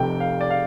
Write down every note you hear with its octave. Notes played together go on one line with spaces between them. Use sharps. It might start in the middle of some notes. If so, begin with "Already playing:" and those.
Already playing: F1 F2 C3 G5
F5
D5
F5